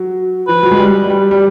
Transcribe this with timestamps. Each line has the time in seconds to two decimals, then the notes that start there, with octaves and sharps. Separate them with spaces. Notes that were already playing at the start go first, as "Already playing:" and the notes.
Already playing: F#3
0.48 F3 B4
0.63 F#3
0.71 G#3
0.78 G3
1.10 G3
1.31 G3